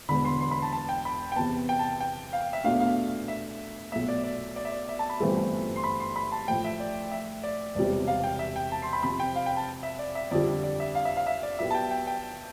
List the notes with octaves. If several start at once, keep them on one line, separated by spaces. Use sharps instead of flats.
E1 E2 D3 B5
C6
C6
B5
A5
A5
G5
B5
G5
E2 C3 E3 B3 A5
G5
A5
G5
G5
F5
E5
E2 B2 A3 D4 F5
F5
E5
B1 B2 A3 E5
D5
D5
D5
E5
D5
E5
A5
B5
G1 G2 E3 A3 C4
C6
B5
C6
B5
A5
A1 A2 F3 A3 G5
E5
D5
E5
D5
E1 E2 C3 G3 D5
F5
G5
E5
G5
A5
C6
B5
F2 C3 F3 C4 B5
G5
F5
G5
A5
E5
D5
E5
F2 D3 G3 D5
D5
E5
F5
E5
F5
E5
D5
B1 B2 B3 E4 G4 E5
A5
G5
G5
G5